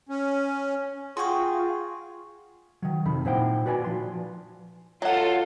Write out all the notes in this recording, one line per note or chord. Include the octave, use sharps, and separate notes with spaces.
C#4
F4 F#4 G#4 G5 C6 C#6
D#3 F#3
F2 C3 D#3 B5
A#2 D#4 E4 C5 F#5 G5
F#4 B4 D5 G#5
F3 C6
F#3 F4 A4 F#5